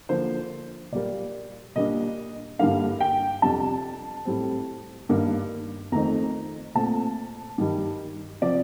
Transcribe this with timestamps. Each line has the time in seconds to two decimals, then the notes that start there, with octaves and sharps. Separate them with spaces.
0.09 D3 F3 A#3 D4 C5
0.92 A#2 G3 A#3 D5
1.76 A#2 G3 A#3 D4 D#5
2.59 G2 D3 G3 A#3 D4 F5
3.01 G5
3.42 F2 C3 G3 D4 A5
4.25 A2 G3 C4
5.09 G2 D#3 A#3 D4
5.92 F2 D#3 A3 C4 A#5
6.75 A#2 A3 C4 A5
7.58 G2 D#3 G3
8.41 C3 F3 C4 D5